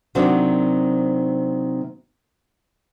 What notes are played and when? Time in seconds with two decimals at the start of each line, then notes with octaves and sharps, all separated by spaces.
0.15 C3 D#3 F#3 C4 D4